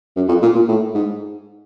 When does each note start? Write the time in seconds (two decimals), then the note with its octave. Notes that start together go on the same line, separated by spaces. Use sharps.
0.16 F#2
0.28 F2
0.42 A#2
0.55 A#2
0.68 A2
0.94 G#2